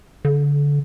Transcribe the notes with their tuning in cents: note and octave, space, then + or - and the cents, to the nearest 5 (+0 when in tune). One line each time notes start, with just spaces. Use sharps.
D3 -25